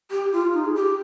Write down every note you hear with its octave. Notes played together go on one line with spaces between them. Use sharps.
G4
F4
D#4
G#4
G4